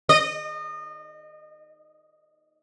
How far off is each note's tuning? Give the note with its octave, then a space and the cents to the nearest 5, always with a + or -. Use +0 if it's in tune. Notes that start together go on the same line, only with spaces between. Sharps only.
D#5 -30